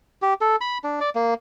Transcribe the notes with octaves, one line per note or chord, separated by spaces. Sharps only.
G4
A4
B5
D4
D5
A#3